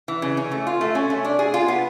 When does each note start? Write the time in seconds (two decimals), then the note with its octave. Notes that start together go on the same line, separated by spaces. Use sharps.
0.08 E3
0.22 C#3
0.37 C#4
0.51 A3
0.67 F4
0.81 A3
0.95 C#4
1.10 A3
1.25 D4
1.39 G#4
1.54 F4
1.68 B3